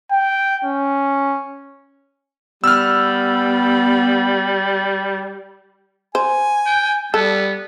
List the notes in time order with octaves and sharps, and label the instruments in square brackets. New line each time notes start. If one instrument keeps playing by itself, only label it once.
[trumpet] G5
C#4
[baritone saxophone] G3 [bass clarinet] B3 [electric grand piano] E6 F6
[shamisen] C5 [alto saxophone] G#5
[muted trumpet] G5
[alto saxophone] G3 [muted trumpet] B3 [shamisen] A4